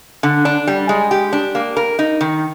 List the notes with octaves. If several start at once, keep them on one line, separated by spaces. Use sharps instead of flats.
D3
D4
G3
G#3
G4
D4
A#3
A#4
D#4
D#3